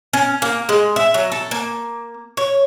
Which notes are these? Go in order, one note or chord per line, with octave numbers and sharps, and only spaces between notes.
C#4
A#3
G#3
E5
F#3
A4
A#3
C#5